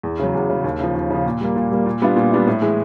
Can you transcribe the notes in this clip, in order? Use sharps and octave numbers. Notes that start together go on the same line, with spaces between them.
E2
C#3 F#3
E2
C#3 F#3
D#2
C#3 F3
D#2
C#3 F3
A#2
G3 A#3
A#2
G3 A#3
A#2
G3 B3 D4 F4
A#2
G3 B3 D4 F4
A2
E3 G#3